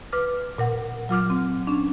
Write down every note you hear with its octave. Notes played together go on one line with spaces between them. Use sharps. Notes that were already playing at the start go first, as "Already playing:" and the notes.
B4 D6 F6
A#2 A#4 F#5
F#3 F4 D6 F6
C4
C#4 D4